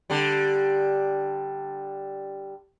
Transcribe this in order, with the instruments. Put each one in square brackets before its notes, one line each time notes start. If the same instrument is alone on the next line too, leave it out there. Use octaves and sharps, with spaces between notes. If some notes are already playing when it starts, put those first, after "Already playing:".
[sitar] D3 G3